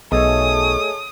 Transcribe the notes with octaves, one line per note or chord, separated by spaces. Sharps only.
B1 A3 G#4 A4 C#5 D#5 D#6